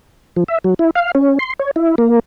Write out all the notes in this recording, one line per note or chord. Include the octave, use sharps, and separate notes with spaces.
F3
E5
F#3
E4
F5
C#4
C6
C#5
E4
A#3